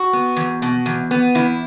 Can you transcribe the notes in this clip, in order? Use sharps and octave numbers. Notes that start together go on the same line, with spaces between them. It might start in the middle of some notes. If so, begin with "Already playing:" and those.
Already playing: F#4
B3
E2
B2
E2
B3
E2 E4